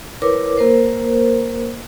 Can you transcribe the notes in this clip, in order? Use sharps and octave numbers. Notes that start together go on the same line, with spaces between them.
E4 A#4 B4 C#5 D6
A#3 A#4 C5